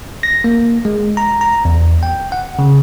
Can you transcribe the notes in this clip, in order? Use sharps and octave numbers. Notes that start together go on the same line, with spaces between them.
A#6
A#3
G#3
A#5
A#5
E2
G5
F#5
C#3